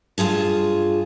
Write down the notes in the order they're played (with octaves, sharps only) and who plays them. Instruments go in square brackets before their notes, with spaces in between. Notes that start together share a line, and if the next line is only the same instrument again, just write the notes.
[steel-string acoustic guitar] G2 F4 G#4 A5